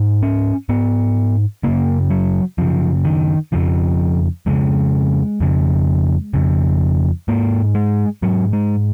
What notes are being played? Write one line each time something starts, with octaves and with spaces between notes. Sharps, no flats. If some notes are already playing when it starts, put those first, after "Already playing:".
Already playing: G#2
C#4
G#2 B3
F#2 C#3 A#3
F#3
F#2 C#3 F3
D#3
F2 C#3 F3
F2 C#3 G#3
F2 C#3
F2 C#3
G#2 A#3
G#3
G#2 F#3
G#3